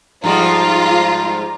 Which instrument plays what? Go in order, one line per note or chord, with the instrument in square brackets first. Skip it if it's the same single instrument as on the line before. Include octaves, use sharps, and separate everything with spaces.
[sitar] G#2 F3 G3 [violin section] F4 [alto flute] A#5